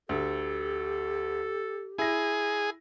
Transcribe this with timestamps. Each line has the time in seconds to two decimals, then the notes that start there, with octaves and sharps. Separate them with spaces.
0.09 D2 G4 A4
1.98 E4 G#4 A#6